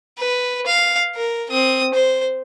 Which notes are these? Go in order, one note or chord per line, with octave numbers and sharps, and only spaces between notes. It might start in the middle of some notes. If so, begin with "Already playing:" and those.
B4
F5
A#4
C4 D#6
C5